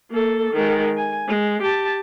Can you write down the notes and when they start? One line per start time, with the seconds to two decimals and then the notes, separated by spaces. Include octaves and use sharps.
0.11 A#3 A4
0.53 D#3 G#3
0.97 G#5
1.28 G#3
1.62 G4 A5